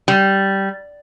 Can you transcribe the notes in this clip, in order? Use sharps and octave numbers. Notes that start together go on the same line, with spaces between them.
G3